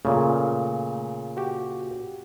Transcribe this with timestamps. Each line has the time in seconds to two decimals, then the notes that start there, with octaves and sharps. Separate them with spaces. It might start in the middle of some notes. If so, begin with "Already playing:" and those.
0.05 A#2 C#3 A3
1.37 F#4 G4